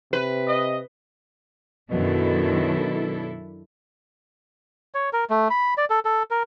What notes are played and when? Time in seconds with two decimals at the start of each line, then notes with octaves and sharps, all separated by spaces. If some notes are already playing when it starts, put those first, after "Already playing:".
0.13 C3 B4
0.47 D#5
1.91 F#2 B2 D#3 D4 E4 A4
4.94 C#5
5.13 A#4
5.30 A3
5.50 B5
5.77 D5
5.90 A4
6.05 A4
6.31 A#4